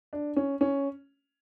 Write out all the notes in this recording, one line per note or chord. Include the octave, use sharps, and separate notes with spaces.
D4
C#4
C#4